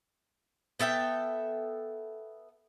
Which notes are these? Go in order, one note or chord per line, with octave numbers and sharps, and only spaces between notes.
B3 A4 E5 G5